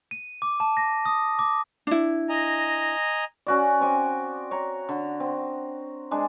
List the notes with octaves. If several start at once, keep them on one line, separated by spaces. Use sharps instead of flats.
D#7
D6
A5
A#6
D#6
D6
D4 E4
D#5 G#5 A#5
C#4 F#4 D5
C4 G#5 D6
C#5 A#5
D3
C4
G#3 D4